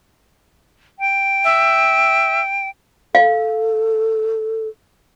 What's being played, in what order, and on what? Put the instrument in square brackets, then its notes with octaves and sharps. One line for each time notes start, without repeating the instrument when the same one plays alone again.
[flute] G5
[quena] E5
[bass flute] A4 [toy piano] F5